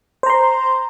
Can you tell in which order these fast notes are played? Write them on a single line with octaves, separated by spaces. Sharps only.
C5 A#5 C6